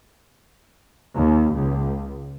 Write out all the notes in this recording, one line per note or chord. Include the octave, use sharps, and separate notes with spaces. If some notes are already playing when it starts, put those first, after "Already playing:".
D#2
C#2